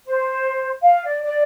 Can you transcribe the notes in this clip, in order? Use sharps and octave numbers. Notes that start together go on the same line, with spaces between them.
C5
F5
D5
D5